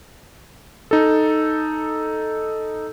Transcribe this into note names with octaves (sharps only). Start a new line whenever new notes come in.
D#4 A4